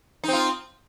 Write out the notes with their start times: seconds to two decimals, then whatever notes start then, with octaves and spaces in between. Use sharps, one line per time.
0.24 D#4
0.28 C4
0.33 F4